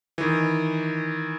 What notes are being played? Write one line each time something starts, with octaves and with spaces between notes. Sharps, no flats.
D#3 E3